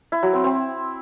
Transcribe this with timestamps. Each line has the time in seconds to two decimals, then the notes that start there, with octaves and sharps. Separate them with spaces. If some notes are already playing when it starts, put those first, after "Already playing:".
0.12 E4
0.23 F#3
0.33 C4
0.44 C4